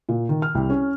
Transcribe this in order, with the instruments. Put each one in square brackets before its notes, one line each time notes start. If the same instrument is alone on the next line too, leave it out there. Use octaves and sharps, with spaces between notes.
[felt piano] A#2
D#3
F6
C2
C#4